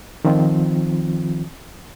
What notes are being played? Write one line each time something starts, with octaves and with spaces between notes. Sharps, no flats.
D#3 F3 C4 F4